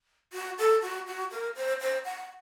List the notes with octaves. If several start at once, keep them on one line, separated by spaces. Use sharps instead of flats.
F#4
A4
F#4
F#4
A#4
C5
C5
F#5